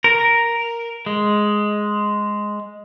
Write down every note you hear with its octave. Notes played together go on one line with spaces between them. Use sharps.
A#4
G#3